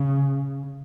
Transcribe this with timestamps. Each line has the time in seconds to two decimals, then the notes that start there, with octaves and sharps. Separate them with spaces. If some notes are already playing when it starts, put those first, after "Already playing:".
Already playing: C#3